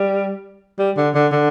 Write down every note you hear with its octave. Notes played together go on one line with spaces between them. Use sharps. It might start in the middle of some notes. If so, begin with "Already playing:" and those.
Already playing: G3
G3
D3
D3
D3